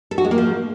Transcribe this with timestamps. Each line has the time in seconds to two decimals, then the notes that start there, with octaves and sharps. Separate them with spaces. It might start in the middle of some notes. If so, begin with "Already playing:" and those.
0.11 A4
0.18 F#4
0.24 G#3
0.31 A#3
0.38 F3